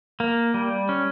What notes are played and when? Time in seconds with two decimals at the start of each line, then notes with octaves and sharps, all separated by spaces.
0.20 A#3
0.54 G3
0.89 C#4